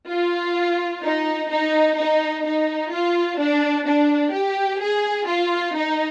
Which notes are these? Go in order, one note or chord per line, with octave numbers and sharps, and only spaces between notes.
F4
D#4
D#4
D#4
D#4
F4
D4
D4
G4
G#4
F4
D#4